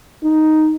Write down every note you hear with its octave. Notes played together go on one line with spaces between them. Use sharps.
D#4